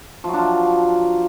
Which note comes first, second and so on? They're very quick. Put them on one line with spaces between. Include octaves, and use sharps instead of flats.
F3 F#3 D4 F4